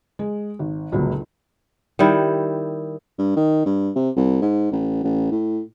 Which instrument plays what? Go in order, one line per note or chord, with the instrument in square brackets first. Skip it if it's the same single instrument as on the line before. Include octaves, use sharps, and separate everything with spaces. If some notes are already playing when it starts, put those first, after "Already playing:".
[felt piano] G#3
G#1
G1 C#2 A#2 F#3
[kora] D#3 G3 E4
[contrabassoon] G2
D#3
G2
C3
C2
G#2
A1
A1
A2